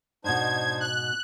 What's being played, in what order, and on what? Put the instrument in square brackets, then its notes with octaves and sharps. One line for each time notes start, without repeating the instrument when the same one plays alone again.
[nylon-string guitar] G#2 B2 [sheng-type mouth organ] D4 D#4 C5 [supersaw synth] G#6
[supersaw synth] F#6